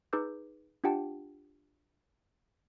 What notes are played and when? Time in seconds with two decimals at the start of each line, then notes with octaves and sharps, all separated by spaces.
0.13 D#4 G#4 B4 D6 E6 G6
0.84 D4 F4 G4 F#5 G5 A5